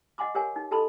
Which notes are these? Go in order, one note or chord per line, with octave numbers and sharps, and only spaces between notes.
D#5 F#5 G#5 C6 D6
G4 A#4 C#5 F#5 G#5
D#4
G4 A4 D#5 A5 B5 C6